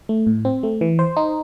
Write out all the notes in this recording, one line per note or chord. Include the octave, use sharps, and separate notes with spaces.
A3
A2
C4
A3
E3
C5
D#4